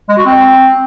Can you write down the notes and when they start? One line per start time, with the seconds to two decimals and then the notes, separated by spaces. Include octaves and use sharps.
0.09 G#3
0.17 F#4
0.26 C4